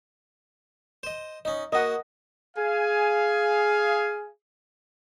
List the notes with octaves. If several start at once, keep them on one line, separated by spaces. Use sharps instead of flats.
C5 D#5
C#4 D#4 D#5
A#3 F#4 D#5 F#5
G#4 F5 G#5